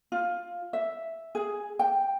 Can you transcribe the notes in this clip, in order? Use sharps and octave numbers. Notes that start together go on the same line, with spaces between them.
F4
E5
G#4
G5